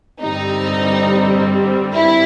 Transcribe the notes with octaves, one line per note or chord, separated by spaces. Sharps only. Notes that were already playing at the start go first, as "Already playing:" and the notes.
G2 D3 G3 C4 D#4
E4